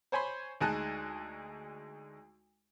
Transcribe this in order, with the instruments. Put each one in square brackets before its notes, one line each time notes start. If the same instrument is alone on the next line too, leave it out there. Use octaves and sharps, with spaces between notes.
[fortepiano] C5 C#5 G#5 B5 C6
D2 G#3 D#4 G#5 A5 F#6